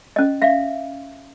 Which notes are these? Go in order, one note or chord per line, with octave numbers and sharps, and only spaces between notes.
C#4 D#5
E5 F5